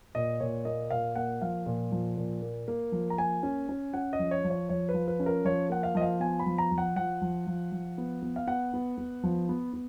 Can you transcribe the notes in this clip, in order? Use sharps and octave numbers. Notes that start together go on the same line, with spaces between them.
A#2 D#5
A#2 C#5
A#3 D#5
A#2 F5
A#3 F#5
F3 F5
A#2
F3
A#2
A#3
A#3
F3
A#5
A#3 G#5
C#4
C#4
C#4 F#5
D#5
F3
C#5
F3
C#5
F3 C#5
B4
F3
B4
C#4
A#4
F3 C#5
A#3 F#5
F5
F3 D#5
F5
B3 G#5
B5
F3
A#5
F3
F#5
F3 F#5
F3
F3
F3
B3
B3
F5
B3 F#5
B3
B3
F3
B3
B3